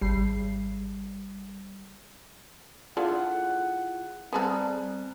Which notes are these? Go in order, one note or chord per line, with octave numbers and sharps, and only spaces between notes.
G#1 G3 C7
A3 D4 E4 F4 G#4 D5 F#5
G3 B3 C4 G#4 A4 A#5 F#6